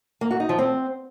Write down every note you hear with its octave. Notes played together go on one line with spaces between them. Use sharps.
A#3
F#4
D#4
F3
C4